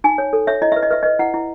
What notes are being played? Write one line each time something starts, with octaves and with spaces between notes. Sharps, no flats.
D#4 G#5
C#5
A4
C#5 E5
E4 D#5
B4 E5
D#5
B4 E5
B4 D#5
E4 F#5
E4